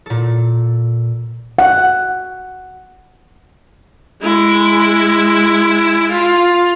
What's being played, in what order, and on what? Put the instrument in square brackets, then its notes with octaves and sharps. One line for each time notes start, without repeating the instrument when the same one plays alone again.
[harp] A#2 A4
[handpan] F#5
[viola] G#3 E4
F4